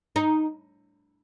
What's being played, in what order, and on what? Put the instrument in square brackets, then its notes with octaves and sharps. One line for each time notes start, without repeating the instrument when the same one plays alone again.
[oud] D#4